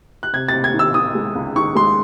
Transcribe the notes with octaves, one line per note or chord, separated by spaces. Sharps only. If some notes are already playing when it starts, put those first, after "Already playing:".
F#6
C3 G#6
C3 A6
G#6
D#3
E6
D#3 D#6
G#3
C#2
D#3 C#6
G#3 C6